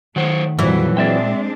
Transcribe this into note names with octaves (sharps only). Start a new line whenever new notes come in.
D#3 F#3 A3 C5 C#5 F#5
F2 A#2 E3 F#3 G3
G#3 C4 D4 D5 E5 G5